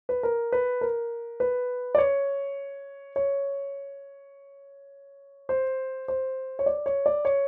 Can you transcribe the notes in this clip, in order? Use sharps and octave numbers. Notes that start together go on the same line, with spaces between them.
B4
A#4
B4
A#4
B4
D5
C#5
C#5
C5
C5
C#5
D5
C#5
D5
C#5